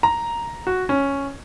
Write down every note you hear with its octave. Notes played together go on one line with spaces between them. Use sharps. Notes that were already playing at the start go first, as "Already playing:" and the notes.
A#5
F#4
C#4